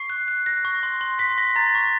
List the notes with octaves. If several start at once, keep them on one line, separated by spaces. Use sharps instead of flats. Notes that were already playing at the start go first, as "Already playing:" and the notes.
Already playing: C#6 C7
F#6
F#6
F#6 A#6
C#6
C6
C6
C6 B6
C6 A#6
A#5 A6
C#6